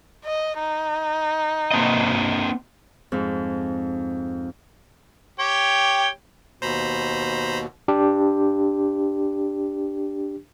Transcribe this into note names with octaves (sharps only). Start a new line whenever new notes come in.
D#5
D#4
A#3 C4 D#5
F2 G#2
G4 C#5 G5
D#2 B2 C5 A#5 B5
D4 G4